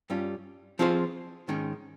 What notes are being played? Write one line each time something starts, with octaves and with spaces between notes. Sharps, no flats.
G2 G3 C#4 F4
F3 C4 F4 G#4 C5
G#2 D#3 G#3 C#4